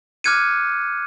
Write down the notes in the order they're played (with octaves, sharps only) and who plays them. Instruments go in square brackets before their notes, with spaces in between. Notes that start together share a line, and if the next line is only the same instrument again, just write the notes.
[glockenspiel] D6 F6 F#6 G#6 C#7 D#7